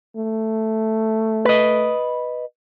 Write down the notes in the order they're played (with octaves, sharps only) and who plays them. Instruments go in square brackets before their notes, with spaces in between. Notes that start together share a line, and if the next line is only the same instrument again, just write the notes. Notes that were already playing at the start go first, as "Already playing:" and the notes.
[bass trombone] A3
[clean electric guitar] B4 D#5